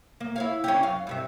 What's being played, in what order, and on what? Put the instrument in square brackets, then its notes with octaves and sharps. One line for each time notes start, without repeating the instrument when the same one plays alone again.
[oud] A#3
E4 C#5 F5
C#4 D4 G4
F#2 F5
G2 C3 E5